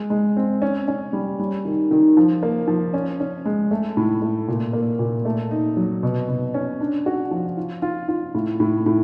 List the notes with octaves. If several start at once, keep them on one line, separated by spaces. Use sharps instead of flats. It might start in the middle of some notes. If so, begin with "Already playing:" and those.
Already playing: G#3
G#3
C4
C#4
C#4
G3
G3
D#3
D#3
F3
A#3
F3
C#4
C#4
G#3
A3
A2
A3
A#2
A#3
A#2
A3
D#4
F#3
B2
B2
C#4
D4
F#4
F3
F4
F4
F4
A2
A2
A2